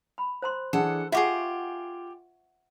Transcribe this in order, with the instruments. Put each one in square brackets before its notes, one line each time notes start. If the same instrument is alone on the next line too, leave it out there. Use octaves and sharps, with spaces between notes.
[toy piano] B5
C5 A#5 C6
[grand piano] E3 D4 G#4 [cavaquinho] A4 F#5
[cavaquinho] E4 G4 G#4 [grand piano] F4 [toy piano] E5 F#5 C#6